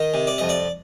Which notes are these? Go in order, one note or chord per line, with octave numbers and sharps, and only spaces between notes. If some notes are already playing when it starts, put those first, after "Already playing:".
Already playing: D#3 D#5
C3
D5
F2 D#5
D5